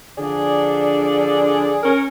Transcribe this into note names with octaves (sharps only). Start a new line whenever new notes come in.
D3 F3 D4 G#4 D5
C#4 A#4